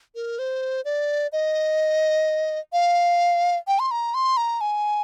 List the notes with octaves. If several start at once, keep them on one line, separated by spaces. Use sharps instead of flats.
A#4
C5
D5
D#5
F5
G5
C6
A#5
C6
A#5
G#5